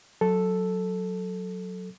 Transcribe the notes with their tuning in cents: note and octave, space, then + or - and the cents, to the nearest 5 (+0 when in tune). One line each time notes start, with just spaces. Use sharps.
F#3 -10 A4 +0